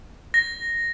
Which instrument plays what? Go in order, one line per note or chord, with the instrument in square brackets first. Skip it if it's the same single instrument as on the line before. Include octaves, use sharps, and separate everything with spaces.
[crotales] A#6